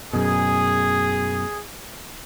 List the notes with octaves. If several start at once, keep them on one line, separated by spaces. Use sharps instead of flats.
F#2 B2 G#4